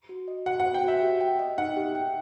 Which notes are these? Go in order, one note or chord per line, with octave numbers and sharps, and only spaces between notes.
F#4
D#5
F#4 F#5
F#5
C5
G5
F#4 E5
G4
G5
D#5
D#4 F#5
G4
G5